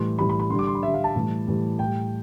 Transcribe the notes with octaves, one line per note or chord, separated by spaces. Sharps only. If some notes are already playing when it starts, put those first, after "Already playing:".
Already playing: A2 E3 G3 C6
A2 E3 G3 B5
B5
B5
D3 G3 C6
D6
C6
B5
D3 G3 E5
F5
A5
A2 E3 G3
A2 E3 G3
A2 G3 G5